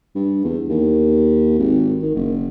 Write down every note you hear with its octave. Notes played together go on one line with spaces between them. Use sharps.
G2
E2
D#2
G#1
D#3
F#1